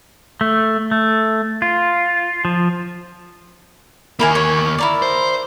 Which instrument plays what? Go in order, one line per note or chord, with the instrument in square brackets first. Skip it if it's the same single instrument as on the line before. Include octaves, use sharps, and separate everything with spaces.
[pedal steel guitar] A3
A3
F4
F3
[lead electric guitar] D#2 A#3 [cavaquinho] E4 A#4 G#5
[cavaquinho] C#5
E4 A#4 D5
[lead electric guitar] C5